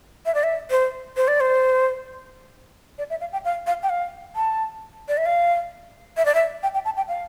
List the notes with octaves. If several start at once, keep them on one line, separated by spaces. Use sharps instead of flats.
E5
D5
E5
C5
C5
D5
C5
D5
E5
F5
G5
F5
F5
G5
F5
A5
D5
E5
F5
E5
D5
E5
G5
G5
A5
G5
F5